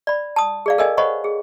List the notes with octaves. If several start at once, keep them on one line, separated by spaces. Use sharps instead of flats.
D5 B5
A5 D#6
G#4 D5 F5
A4 A#4 D5 D#5 F5 G#5
C5 C#5 D#5 F#5 B5 C#6
G#4